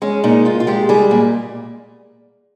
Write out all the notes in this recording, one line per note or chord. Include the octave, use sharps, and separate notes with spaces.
G#3 C#4
A#2 D#4
A#2 F4
F4
G#3 G4
G3 G#4
A#2